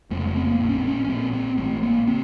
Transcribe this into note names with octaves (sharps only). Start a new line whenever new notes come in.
F1 F2 C#3 A3
A3
C4
A#3
A#1 A2
C#4
C4
C#4
C#4
A#1 A#2 C4
C4
A1 A2 A3
A#3
C#3 C4